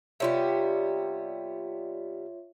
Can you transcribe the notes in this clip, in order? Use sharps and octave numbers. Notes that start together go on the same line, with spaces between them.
C3 G3 B3 F4 C#5 E5